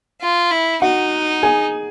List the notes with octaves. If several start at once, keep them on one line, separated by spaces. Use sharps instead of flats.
F4
E4
D#4 F#4 F#5
G#4 G#5